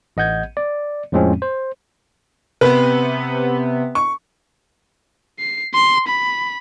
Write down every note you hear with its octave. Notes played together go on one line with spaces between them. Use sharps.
A1 D#5 F#5 G6 G#6
D5
F2 A2 F3 G#3 C4 C#4
C5
C3 B3 B4
C#6
C7
C6
B5